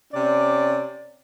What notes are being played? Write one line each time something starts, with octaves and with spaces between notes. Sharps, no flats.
C3 C#4 D5